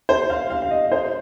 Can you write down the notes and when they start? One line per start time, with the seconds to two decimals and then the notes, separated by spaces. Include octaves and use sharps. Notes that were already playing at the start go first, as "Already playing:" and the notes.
0.09 C5
0.30 F5
0.50 F5
0.62 F5
0.71 D#5
0.92 C5